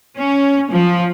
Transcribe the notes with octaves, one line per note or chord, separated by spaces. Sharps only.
C#4
F3